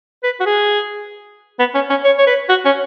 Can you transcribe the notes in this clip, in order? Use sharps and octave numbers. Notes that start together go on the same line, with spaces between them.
B4
F#4
G#4
B3
C#4
C#4
C#5
C#5
B4
F#4
C#4